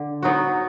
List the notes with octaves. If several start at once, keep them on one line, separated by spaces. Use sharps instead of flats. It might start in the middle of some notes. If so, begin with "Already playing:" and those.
Already playing: D3
F#3 B3 D#4 F#4